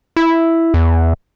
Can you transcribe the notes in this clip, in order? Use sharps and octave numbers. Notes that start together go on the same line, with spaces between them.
E4
E2